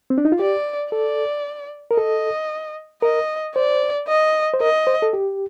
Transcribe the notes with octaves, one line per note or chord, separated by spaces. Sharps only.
C4
D4
D#4
F4
G4 D5
A4 D5
A#4
A4 D#5
A#4 D#5
C5 D5
D#5
C5
A#4 D#5
C5
A4
G4